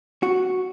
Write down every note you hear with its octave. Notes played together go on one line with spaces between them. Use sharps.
F#4